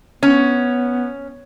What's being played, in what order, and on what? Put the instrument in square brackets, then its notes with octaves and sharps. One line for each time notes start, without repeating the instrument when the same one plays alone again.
[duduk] B3 [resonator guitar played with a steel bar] C#4